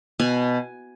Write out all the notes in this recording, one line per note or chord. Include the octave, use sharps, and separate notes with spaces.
B2 G#5